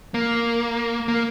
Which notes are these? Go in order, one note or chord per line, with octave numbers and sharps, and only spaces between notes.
A#3
A#3